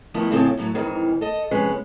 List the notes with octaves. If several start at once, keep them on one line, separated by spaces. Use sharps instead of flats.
D#3 F3 A3 B3 D#4 E4
D#2 A2 C#3 F3 C4 A4
F#2 A2 F#3
F2 G#2 D#3 E3
A4 D#5
C3 F3 G#3 C#4 B4